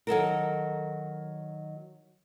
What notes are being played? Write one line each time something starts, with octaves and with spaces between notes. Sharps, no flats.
D#3 F#3 A4 A#4